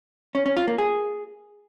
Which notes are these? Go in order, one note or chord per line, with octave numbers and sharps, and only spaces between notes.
C#4
C#4
F4
A#3
G#4